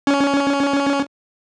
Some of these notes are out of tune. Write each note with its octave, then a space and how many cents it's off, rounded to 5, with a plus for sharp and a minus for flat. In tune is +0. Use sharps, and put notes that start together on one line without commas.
C#4 +15